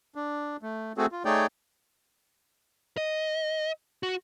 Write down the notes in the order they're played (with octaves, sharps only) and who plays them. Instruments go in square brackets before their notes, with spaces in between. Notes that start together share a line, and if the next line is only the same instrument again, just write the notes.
[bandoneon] D4
A3
A3 C4 F#4 G#4 A4
F4
A3 D#4 G#4 C#5 D5 G5
[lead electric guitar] D#5
F#4